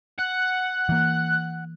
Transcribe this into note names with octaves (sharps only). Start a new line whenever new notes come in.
F#5 F#6
E3 A#3